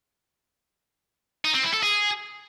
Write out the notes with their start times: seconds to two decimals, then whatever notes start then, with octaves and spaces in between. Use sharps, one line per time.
1.45 D#4
1.54 C4
1.64 E4
1.73 A4
1.83 G#4